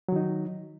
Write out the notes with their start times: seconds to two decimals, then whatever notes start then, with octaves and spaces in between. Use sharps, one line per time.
0.09 F#3
0.12 D#3
0.16 D#4